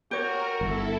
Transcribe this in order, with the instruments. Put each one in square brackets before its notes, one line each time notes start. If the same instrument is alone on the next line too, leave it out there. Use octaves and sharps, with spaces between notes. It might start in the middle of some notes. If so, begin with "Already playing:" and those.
[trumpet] F#4 [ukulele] G4 C#5 [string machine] A#4
[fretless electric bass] G1 [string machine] E4 A4